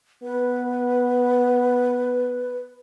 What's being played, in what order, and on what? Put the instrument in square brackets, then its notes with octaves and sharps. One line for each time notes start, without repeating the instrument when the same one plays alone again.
[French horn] B3 [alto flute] B4